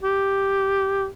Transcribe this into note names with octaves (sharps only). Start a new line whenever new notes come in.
G4